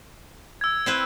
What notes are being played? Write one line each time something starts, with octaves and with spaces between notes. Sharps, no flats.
E6 G#6
C4 E4 B4